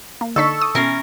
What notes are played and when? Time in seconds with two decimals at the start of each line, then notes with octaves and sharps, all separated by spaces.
0.21 A#3
0.36 D3 D#4 A4 C#6 E6 B6
0.61 D#6
0.75 B2 E3 C#4 A#4 C7